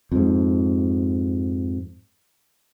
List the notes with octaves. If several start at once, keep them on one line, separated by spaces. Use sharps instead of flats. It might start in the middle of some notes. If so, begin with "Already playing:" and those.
F2 G#2